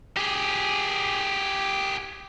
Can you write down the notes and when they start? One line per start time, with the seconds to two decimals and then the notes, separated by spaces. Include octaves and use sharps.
0.17 G4 G#4